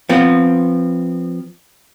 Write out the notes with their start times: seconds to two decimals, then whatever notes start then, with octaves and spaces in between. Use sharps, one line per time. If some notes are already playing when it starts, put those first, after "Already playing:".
0.09 F3 B3 C4